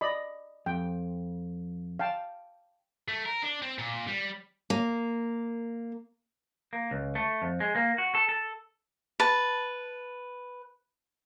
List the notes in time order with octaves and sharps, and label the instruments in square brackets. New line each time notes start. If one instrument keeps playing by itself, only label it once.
[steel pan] D5 D#5 B5
[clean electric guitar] F2 [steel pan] G5
[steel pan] F5 G5 A5
[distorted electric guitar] A3
A#4
D4
C4
A#2
G3
[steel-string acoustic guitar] A#3
[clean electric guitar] A#3
C#2
A3
F2
G#3
A#3
F#4
A4
A4
[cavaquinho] B4 A5